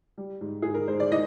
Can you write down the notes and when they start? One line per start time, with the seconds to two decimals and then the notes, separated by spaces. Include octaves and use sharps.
0.18 G3
0.41 G#2
0.62 G#2 G#4
0.74 A#4
0.88 G#2 C5
1.00 D5
1.12 G#3 D#4 D#5